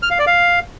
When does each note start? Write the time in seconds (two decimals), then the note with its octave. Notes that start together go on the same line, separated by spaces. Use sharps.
0.02 F6
0.11 F5
0.19 D5
0.27 F5